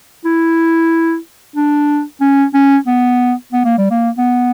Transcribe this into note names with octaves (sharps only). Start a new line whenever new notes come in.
E4
D4
C#4
C#4
B3
B3
A#3
G3
A#3
B3